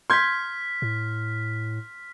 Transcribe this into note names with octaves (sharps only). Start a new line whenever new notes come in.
C6 F6 G6 G#6 B6
A2